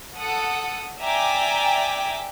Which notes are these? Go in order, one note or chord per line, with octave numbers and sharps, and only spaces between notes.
A4 F#5 D#6
D5 E5 G5 G#5 A#5 D6